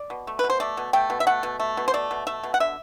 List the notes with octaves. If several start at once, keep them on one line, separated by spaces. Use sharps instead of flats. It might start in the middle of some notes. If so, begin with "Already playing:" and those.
Already playing: D5
B2
A3
B4
B2
C5
A3 D5
B2
A3 G5
B2
E5
A3 F#5
B2
A3
B2
C5
A3 D5
B2
A3 E5
B2
F#5
D3 E5